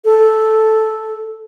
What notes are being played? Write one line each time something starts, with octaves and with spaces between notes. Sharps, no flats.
A4